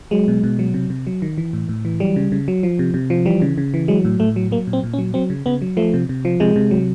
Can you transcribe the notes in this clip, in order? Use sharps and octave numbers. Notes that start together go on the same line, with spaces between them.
F#3 G#3
B2
B2
F#3
C3
C3
F#3
D#3
E3
A2
A2
E3
F#3 G3
C#3
C#3
F#3
F3
C3
C3
F3
E3 G3
C#3
C#3
E3
F#3 G#3
A2
A2 A3
F#3
F#3 A#3
A#2
C4
A#2
C#4
F#3
F#3 C4
C#3
C#3 B3
F#3
F3 A3
C3
C3
F3
C3 G#3
C3
F#3